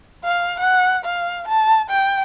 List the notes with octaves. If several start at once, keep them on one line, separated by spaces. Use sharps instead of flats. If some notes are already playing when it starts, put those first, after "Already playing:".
F5
F#5
F5
A5
G5